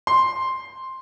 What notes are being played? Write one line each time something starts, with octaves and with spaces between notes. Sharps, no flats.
C6